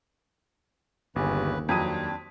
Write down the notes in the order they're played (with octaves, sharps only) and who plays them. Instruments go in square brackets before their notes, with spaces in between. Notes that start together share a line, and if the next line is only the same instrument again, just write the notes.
[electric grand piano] G1 G4 G#5 [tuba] D#2 [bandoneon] C#3 B4
[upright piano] F2 F#3 D#6 [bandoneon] C4 D4 [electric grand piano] A5 B6 D#7